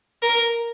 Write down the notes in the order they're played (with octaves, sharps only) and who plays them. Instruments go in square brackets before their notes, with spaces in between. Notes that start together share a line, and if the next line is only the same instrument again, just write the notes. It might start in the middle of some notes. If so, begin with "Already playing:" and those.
[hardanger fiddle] A#4